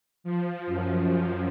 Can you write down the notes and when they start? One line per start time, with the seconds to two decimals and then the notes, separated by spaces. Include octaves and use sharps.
0.24 F3
0.66 F#2